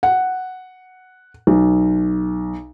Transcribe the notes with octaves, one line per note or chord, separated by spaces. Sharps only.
F#5
B1